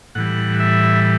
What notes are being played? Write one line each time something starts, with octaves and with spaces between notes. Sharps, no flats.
A2 E3 G3 F#5
E5